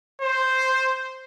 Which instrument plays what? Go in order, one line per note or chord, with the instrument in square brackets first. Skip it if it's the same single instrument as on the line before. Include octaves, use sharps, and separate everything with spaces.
[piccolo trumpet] C5